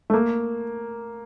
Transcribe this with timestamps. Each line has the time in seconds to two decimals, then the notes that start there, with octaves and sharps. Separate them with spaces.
0.10 A3
0.14 A#3